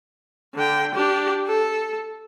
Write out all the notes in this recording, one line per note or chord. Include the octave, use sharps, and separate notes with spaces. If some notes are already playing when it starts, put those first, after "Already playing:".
D3 G5
D4 G4
A4